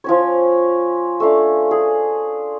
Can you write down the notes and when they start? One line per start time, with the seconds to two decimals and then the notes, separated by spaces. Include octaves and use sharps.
0.04 F3 C#4 C#5
1.20 A3 C#4 D4 F5
1.71 G#4